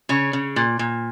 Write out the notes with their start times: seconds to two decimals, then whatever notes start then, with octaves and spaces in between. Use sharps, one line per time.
0.09 C#3 C#5
0.33 C#3
0.56 A#2
0.79 A#2